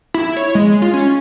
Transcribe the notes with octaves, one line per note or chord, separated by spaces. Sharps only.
E4
C#5
G#3
F4
C#4